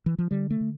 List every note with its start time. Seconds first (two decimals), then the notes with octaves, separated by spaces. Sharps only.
0.06 E3
0.19 F3
0.31 D3 G3
0.51 A3
0.61 D3